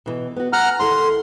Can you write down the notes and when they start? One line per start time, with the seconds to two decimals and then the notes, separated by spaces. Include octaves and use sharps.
0.06 B2 E3
0.36 B3 F#4
0.53 F#5 G#5 A#5 F6
0.80 D#2 E4 A4 C6